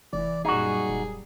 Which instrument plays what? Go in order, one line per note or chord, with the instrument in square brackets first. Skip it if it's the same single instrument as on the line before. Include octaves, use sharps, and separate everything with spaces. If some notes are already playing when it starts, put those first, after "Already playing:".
[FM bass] F1 [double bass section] E3 [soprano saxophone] D5
[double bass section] F#2 A#2 G3 [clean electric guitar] D#4 F#4 [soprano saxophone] G#4
[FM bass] D#1